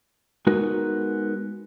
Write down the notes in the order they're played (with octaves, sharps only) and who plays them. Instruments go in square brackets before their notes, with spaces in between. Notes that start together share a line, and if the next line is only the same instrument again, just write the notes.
[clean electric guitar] G#3 B3 D#4 F#4 A#4